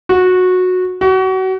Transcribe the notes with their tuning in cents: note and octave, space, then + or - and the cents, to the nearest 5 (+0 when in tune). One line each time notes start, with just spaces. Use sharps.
F#4 -15
F#4 +30